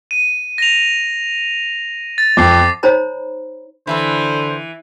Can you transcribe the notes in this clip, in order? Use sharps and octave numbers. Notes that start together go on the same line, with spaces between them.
D#7
A#6 F7
A6
F2 D6 C7
D#4 C5 C#5 A#5 B5
D3 E3 E4 A4 B4 C5